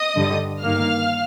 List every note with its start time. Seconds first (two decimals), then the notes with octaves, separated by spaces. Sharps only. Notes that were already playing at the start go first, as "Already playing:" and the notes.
Already playing: D#5 D#6
0.15 G2 D3 G3
0.63 G2 D#3 A#3 F5 F6